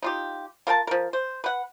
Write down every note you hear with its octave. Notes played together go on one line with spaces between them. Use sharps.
D#4 F4 G4
F4 A#4 G5 A5
F3 A#4
C5
B4 F#5